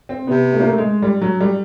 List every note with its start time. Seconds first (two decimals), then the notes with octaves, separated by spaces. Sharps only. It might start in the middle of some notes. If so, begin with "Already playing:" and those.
0.09 C4
0.27 C3 B3
0.53 A3
0.60 A#3
0.67 A3
0.78 G#3
1.02 G3
1.22 F#3
1.41 G3